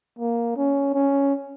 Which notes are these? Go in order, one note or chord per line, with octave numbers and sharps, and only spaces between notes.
A#3
C#4
C#4